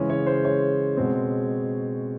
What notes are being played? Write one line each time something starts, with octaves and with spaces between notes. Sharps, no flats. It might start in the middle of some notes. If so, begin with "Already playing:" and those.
Already playing: C#3 E3 G#3 C#4
C#5
C5
C#5
B2 G#3 C4